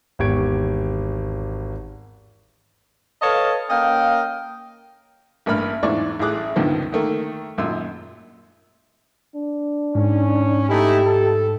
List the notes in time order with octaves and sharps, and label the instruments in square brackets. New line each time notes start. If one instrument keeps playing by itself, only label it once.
[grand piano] G#1 E2 G4 C#6 G#6 D7
[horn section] A4 B4 C#5 D#5 F5 A5
A#3 C#4 D#5 F5 G5
[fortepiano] A1 G2 A#3 B5 F6
E2 G#2 E3 D4 D5 C#6
A1 A2 G#4 D6 F#6
C#2 G2 D3 D#3 F3 B3
D#3 A3 A#3
G#1 F#2 A#2 C6 E6
[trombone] D4
[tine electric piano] G#2 [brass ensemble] C#4
[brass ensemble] A3 D#4 E4 [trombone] G4
[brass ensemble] A4